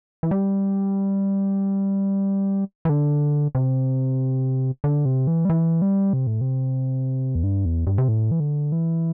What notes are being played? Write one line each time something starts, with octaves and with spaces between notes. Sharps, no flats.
E3
G3
E3
D3
C3
D3
C3
E3
G3
E3
G3
C3
A2
C3
E2
G2
E2
G2
C3
A2
E3
D3
E3